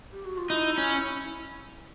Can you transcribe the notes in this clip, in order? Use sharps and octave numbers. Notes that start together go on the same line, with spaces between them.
G4
F#4
F4
D#4 E4
C#4